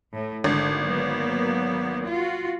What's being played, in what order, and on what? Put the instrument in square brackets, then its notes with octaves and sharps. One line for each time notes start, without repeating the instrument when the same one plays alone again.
[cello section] A2
[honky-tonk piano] G#1 [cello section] D3
[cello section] F#3 A#3 B3
F4 F#4